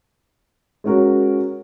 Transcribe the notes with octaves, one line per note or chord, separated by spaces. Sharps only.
G#3 C#4 F#4 A#4